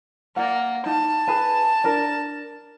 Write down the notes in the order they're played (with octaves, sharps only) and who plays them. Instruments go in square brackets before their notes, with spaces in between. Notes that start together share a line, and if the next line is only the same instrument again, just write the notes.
[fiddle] A#3 [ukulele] D5 F#5
[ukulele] D#4 [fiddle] A5
[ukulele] G#4 B4 G#5
D4 A#4 D5